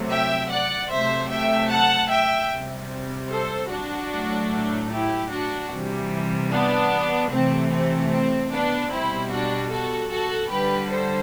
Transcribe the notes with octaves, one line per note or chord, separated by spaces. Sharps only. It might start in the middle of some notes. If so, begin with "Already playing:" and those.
Already playing: C3 F#3 A3
E5 G5
D5 F#5
C3 F#3 A3 C5 E5
E5 G5
F#5 A5
E5 G5
C3 G3
A4 C5
D4 F#4
A2 F#3 A3
E4 G4
D4 F#4
C3 E3 G3
B3 D4
C3 E3 A3 C4
C4
C4
B3 D4
B2 G3 C4 E4
D4 F#4
F#4 A4
F#4 A4
D3 G3 G4 B4
A4 C5